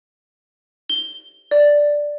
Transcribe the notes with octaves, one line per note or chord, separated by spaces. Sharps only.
G7
D5